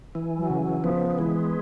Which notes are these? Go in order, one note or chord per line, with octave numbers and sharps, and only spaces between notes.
E3
F#3
C#3
F#3
F3 B3
E3 G#3